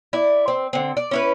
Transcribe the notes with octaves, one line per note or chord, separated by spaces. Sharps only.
E4 D5
C4
D3 C4
D5
C#4 E4 B4